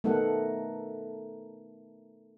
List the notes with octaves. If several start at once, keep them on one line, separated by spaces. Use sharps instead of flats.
A3 B3 D#4 A4 A#4 F#5